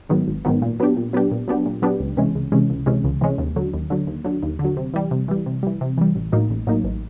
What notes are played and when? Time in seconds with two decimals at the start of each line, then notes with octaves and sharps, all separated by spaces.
0.09 G#2 D#3 F#3 B3
0.27 G#1
0.45 G#2 D#3 F#3 B3
0.62 A#2
0.80 F#3 B3 D4 G4
0.97 A#2
1.13 F#3 B3 D4 G4
1.32 A#2
1.48 F#3 B3 D4 G4
1.66 A#2
1.82 F#3 B3 D4 G4
2.00 C#2
2.17 C3 E3 G#3 C#4
2.35 C#2
2.52 C3 E3 G#3 C#4
2.70 C#2
2.86 C3 E3 G#3 C#4
3.04 C#2
3.21 C3 E3 G#3 C#4
3.38 D#2
3.56 D3 F#3
3.74 D#2
3.90 D3 F#3
4.07 D#2
4.24 D3 F#3
4.43 D#2
4.59 D3
4.65 F#3
4.77 C3
4.94 E3 G3
5.11 C3
5.28 E3 G3
5.46 C3
5.63 E3 G3
5.81 C3
5.98 E3 G3
6.15 A1
6.32 A2 F#3 A#3 D#4
6.50 A1
6.67 A2 F#3 A#3 D#4
6.84 A1